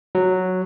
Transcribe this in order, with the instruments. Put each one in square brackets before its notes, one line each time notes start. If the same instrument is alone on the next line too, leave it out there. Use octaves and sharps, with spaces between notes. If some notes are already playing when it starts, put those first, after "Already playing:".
[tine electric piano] F#3